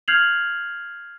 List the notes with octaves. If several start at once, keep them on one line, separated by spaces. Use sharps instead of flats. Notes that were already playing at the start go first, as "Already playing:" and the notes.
F6 G6 G#6 C7 F7 F#7